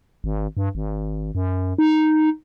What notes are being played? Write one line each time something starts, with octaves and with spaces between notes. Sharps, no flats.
G#1
G2
G#1
F#2
D#4